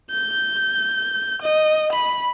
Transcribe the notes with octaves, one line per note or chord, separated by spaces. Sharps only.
G6
D#5
B5